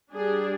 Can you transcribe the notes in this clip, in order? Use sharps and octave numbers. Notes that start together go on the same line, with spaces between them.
G3 D4 G#4